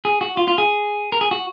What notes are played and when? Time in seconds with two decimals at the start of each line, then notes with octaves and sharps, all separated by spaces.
0.05 G#4
0.21 F#4
0.37 F4
0.48 F4
0.58 G#4
1.12 A#4
1.21 G#4
1.31 F#4